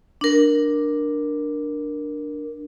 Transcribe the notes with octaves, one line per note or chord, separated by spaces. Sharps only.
D4 A#4